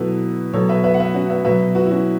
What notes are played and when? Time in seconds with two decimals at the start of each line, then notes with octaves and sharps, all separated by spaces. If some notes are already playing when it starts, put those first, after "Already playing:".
Already playing: B2 F#3 E4 A4 B4
0.53 B2 F#3 A4 C#5
0.69 B4 E5
0.84 B4 E5
0.94 F#5
1.00 B4 E5
1.14 C#4 F#4
1.30 B4 E5
1.45 B2 F#3 B4 E5
1.75 F#4 B4
1.85 E4
1.91 C#4 F#4